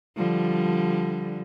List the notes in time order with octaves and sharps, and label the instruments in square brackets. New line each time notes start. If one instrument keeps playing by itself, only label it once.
[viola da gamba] D3 F3 G3